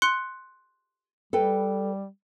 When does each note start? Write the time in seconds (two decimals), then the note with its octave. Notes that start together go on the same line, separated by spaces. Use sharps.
0.02 C6 F#6 C#7
1.33 G3 A4 B4 G5